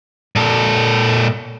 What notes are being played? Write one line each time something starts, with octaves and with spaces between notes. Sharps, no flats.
A#2 A4